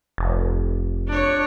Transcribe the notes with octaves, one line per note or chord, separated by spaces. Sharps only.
F1
D4 C#5